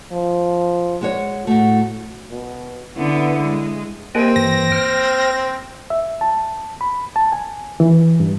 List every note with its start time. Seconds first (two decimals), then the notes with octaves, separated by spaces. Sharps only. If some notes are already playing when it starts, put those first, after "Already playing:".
0.12 F3
1.01 G#3 F#4 C#5
1.47 A2 A3 F#4
2.31 B2
2.97 D3 B3 E4
3.42 G#3
4.15 A#3 C4 G4 A#4 D#5 G5 G#5
4.36 G2 E3 A#6
4.72 C5 G5 F6
5.90 E5
6.21 A5
6.81 B5
7.16 A5
7.32 G#5
7.80 E3
8.20 G2